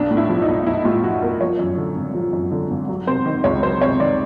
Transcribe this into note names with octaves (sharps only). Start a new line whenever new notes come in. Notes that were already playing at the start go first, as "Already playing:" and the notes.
Already playing: B1 D4
A2
E4
F3
D#4
B1
B1 E4
A2 F4
F3 F#4
B1 A#4
F3 C#5
F#2
D3
G#1
F3
F#2
D3
G#1
F#3
C3 C5
D#3
C#2 C#5
F#3 C5
C3 C#5
D#3 D5